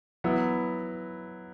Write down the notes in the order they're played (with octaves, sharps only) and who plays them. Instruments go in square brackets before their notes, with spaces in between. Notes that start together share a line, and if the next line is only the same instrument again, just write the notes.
[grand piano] F#3 B3 E4